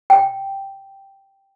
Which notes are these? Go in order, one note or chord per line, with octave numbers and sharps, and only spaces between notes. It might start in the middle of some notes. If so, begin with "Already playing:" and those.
G5